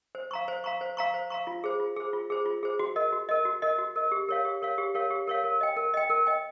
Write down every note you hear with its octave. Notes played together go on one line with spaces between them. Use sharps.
C5
F5 A#5 C#6
C5
F5 A#5 C#6
C5
F5 A#5 C#6
C5
F5 A#5 C#6
F4
G#4 C5
F4
G#4 C5
F4
G#4 C5
F4
G#4 C5
F#4
A#4 D#5
F#4
A#4 D#5
F#4
A#4 D#5
F#4
A#4 D#5
G4
A#4 C#5 F5
G4
A#4 C#5 F5
G4
A#4 C#5 F5
G4
A#4 C#5 F5
A#4
D#5 G5
A#4
D#5 G5
A#4
D#5 G5